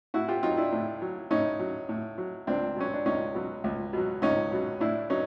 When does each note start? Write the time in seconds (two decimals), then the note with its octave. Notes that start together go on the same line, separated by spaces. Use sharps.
0.14 A2 E4 F#4
0.28 F4 G4
0.43 F#3 D#4 F4
0.57 D4 E4
0.72 A2
1.02 F#3
1.30 A2 C#4 D#4
1.60 F#3
1.89 A2
2.18 F#3
2.47 C#2 C4 D4
2.76 B2 F#3 C#4
2.94 D4
3.06 C#2 C#4 D#4
3.35 B2 F#3
3.64 C#2
3.93 B2 F#3
4.22 C#2 C#4 D#4
4.52 B2 F#3
4.80 A2 D4 E4
5.10 F#3 C#4 D#4